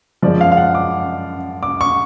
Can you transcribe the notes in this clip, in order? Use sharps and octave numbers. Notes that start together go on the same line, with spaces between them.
F#2 F3 G#3 C#4 D5
F5
F5
F#5
D6
D6
C#6